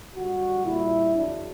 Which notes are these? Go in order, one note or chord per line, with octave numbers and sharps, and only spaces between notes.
F#2 D3 G3 F#4
A#2 G3 E4
E2 C#3 F#3 D4